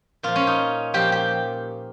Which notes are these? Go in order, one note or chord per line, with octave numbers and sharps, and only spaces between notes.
A#2 F3 F4
C#4
D#4
A#2 F3 G4
G4